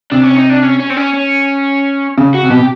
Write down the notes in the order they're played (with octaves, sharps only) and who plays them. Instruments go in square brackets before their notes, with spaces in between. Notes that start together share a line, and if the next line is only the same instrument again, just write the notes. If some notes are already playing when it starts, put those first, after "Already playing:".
[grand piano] C3 [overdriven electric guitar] D4
[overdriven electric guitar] C#4
D#4
D4
C#4
C#4
C4
C#4
C#4
[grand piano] C#3
[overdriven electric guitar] F#4
[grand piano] C3
[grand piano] B2 [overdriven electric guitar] G4
[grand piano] C3